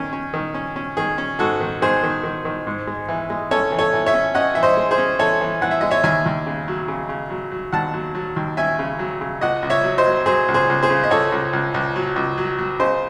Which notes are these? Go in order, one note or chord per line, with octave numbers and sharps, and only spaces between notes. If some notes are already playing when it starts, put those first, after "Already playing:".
Already playing: D#3 C#4
C#4
D#3
C#4
C#4
D#3 G#4
C#4
G#2 F#4 A4
D#3
D#3 G#4 C5
D#3
D#3
D#3
G#2
G#3
E3
G#3
C#4 A4 C#5
E3
A4 C#5
E3
C#5 E5
C#4
C#4 D#5 F#5
E3 E5
C5 D#5
G#3
G#4 C5
C#4
E3 A4 C#5
E3
E3 F#5
E5
G#3 D#5
C#5 E5
D#2 E5 G#5
D#2
C#3
F#3
C#3
C#3
F#3
F#3
D#2 F#5 A5
F#3
F#3
D#2
C#4 E5 G#5
C#3
F#3
C#3
C#2 D#5 F#5
C#2
C#5 E5
F#3
C5 D#5
F#3
F#3 G#4 C5
C#2
G#4 C5
C#2
G#4 C5
C#3
D#5
C#2 A4 C#5
C#2
C#2
C#2
F#3
C#2
F#3
F#3
C#3 C5 D#5